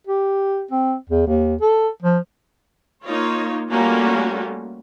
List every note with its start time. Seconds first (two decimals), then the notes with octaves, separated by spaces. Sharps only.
0.07 G4
0.71 C4
1.09 E2
1.27 D#2
1.61 A4
2.02 F3
3.05 A#3 D#4 F4 C#5
3.71 G3 A3 A#3 C#4 F4 F#4